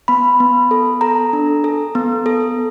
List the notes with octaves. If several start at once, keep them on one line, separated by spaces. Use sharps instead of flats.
B3 B5
B3
A4
A4 A#5
D4
A4
B3
A4